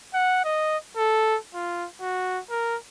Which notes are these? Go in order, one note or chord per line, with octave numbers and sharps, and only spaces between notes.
F#5
D#5
A4
F4
F#4
A#4